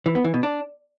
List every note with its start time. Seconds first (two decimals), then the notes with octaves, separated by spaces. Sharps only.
0.06 E3
0.15 B3
0.24 E3
0.34 B2
0.43 D4